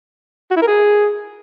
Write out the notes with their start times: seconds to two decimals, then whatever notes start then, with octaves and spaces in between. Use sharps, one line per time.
0.51 F#4
0.56 E4
0.62 A#4
0.67 G#4